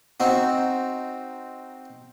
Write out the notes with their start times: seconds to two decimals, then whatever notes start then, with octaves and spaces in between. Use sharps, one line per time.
0.20 C4 D#4 F#4